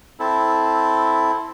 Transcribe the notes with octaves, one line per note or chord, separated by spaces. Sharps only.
C4 E4 A4